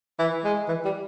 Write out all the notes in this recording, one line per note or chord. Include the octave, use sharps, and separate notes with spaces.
E3
G#3
E3
G3